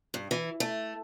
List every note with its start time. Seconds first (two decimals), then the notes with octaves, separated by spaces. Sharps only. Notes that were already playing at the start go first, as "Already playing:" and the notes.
0.14 G2
0.31 E3
0.60 A3